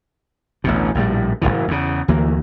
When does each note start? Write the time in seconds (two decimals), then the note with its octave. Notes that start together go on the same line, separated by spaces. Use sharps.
0.64 A1 D2 B2
0.95 A#1 A2 C#3 G3
1.42 F#1 B1 A2 E3
1.68 E2 C#3
2.08 D2 E3 A#3